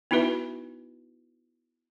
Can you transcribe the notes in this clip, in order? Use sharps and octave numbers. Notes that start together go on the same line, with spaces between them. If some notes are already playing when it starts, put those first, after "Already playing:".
B3 D#4 E4 F#4 B4 E5